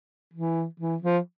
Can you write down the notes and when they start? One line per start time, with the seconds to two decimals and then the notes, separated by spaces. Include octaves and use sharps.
0.34 E3
0.80 E3
1.02 F3